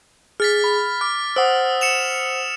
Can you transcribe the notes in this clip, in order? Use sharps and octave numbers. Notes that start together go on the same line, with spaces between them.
G#4 F6 A6 B6
B5
D6 F6
C5 F#5 D#6 E6
C#7 E7 F7